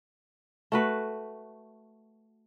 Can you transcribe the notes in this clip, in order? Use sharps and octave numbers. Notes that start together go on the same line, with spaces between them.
A3 F#4 B4